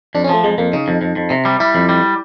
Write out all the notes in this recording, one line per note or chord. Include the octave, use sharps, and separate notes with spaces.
F2 D4
C#4
F3 A3
F2 G#3
F2 A#3
C#3 D#4
F2
F2
F2
C3
G3
G3 E4
F2
G3